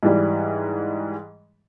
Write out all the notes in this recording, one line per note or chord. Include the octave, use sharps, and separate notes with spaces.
G#2 E3 G3